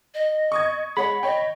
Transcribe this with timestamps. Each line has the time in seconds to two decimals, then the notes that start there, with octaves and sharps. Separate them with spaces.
0.14 D#5
0.52 C#6 D#6 G#6
0.97 G#3 C#5 F#5 B5
1.23 C#5 D#5 G5